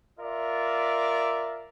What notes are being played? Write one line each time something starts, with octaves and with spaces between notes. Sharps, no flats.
F4 A#4 D5 E5